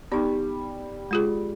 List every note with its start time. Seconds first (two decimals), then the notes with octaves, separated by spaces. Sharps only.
0.12 G3 B3 D#4
1.11 G#3 F4 G#4